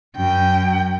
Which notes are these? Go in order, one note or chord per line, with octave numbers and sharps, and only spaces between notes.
F#2 G5